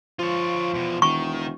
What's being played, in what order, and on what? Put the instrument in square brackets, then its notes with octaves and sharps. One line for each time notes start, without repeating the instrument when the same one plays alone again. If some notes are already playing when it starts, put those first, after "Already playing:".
[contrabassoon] F3 [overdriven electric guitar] F4 C#5
[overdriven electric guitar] E2 B2
[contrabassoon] E1 [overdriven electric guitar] D#3 [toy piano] C#6